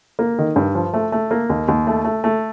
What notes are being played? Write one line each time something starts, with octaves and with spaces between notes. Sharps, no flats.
A#3
D#3
G2
F3
A3
A3
A#3
D#2
D#2
A3
A3
A3